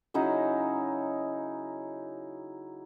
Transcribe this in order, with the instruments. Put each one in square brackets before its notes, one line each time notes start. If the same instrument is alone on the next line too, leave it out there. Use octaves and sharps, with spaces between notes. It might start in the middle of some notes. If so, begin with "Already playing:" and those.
[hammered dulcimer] C#3 F#3 D#4 E4